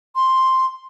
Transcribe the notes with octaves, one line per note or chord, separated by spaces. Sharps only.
C6